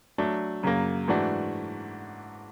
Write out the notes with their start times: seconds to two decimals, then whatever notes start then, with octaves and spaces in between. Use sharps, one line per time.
0.18 F#3 A3 D4
0.63 F#2 C#3 F#3 A#3
1.08 G#2 E3 A3 D4 F#4